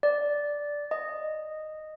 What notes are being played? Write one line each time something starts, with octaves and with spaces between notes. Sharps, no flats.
D5
D#5